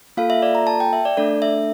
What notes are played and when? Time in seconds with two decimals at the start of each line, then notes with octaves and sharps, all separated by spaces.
0.17 A#3 F4 A4 F5
0.30 E5
0.42 D5
0.55 A#5
0.67 A5
0.80 G5
0.93 E5
1.05 D5
1.17 A3 D4 A4 D5
1.42 E5